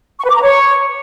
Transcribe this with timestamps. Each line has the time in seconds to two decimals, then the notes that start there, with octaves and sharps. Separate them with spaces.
0.19 C#6
0.25 B4
0.30 D6
0.36 A#5
0.41 C#5